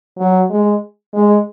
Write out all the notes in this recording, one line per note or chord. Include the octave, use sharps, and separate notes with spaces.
F#3
G#3
G#3